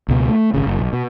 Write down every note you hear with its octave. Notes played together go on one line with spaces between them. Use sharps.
C#2 B2
A3
G#1 C#3
F#1
B1
B2